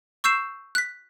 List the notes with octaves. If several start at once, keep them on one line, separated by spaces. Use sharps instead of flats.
C#6 E6 G6 C7 E7
F#6 B6